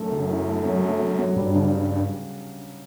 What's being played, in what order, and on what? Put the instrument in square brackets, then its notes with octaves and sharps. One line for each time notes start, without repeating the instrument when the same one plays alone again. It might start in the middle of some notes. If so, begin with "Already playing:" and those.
Already playing: [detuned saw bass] F#2 [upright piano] A3
[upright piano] C#3
E4
A3
F#3
A3
F#3
F#3
[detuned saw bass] G2 [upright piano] G3
[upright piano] C#3